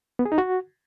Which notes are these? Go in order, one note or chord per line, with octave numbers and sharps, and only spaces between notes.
B3
G#4
D#4
F#4